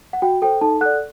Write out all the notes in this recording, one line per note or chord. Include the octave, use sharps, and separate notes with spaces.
F#5
F#4 G5
A4 C5 G5
D#4 A4 A5
A4 D5 F#5 F#6